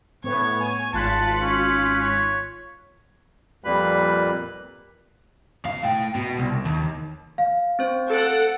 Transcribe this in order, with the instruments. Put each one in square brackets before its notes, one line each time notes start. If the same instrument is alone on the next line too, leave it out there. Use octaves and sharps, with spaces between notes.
[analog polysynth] A2 B3 [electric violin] C#5 G#6
[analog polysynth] G#5
[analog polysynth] G#1 F#6 B6 [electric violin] F4 C#7 [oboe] A5
[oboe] C#4
C#5
[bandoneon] F2 A#2 G3 A#3 B4 B5
[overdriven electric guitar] B2 F5
A2 G5
B2
C2
D#2
[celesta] F5
[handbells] C4 C5
[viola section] A4 F#5 [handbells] A6 D7